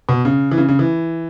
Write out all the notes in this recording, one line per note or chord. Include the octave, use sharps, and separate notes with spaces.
B2
C#3
E3
C#3
C#3
E3